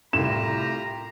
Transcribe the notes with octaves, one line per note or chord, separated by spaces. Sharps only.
C2 A2 F4 G4 A#5 E7